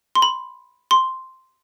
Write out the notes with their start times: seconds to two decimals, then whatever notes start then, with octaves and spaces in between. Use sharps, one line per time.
0.15 C6
0.22 B5
0.91 C6